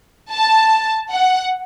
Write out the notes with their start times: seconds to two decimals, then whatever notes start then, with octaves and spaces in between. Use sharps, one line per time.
0.32 A5
1.12 F#5